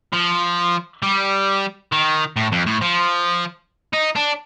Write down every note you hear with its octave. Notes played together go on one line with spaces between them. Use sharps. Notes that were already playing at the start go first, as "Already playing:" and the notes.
F3
G3
D#3
A2
F2
A2
F3
D#4
D4